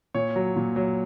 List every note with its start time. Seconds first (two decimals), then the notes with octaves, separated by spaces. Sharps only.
0.15 A#2 C#5
0.36 F#3
0.56 A#2
0.76 F#3